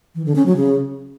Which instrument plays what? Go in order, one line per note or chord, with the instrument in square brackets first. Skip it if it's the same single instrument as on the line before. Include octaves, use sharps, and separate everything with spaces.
[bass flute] E3
D3
C#4
F#3
C#3